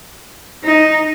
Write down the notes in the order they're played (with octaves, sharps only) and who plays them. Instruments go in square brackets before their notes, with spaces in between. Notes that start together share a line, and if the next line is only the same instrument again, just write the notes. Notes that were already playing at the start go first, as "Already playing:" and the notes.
[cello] D#4